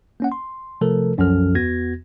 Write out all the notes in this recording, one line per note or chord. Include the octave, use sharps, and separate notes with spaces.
A#3 C#4 F#5
C6
C3 F3 A3 A4 A#4
C2 F#2 F3 C#4 A4 F6
E2 B3 F#4 G#6 A#6